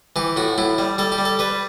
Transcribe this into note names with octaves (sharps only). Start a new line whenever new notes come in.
E3 G4
A2 F#4
A2 E4
G3
G3 A4
G4
G3
A4
G3 B4